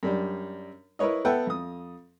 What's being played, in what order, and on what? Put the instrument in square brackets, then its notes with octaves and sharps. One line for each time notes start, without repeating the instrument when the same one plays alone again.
[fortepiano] F#2 G3 D4
E4 A#4 B4 C#5 D#5
B3 A4 B4 E5 F#5 G5
F2 D#6